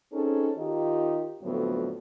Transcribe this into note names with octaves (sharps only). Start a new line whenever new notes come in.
C4 C#4 D#4 G#4 A4
D#3 D#4 F4 G4
F2 A2 D3 F#3 B3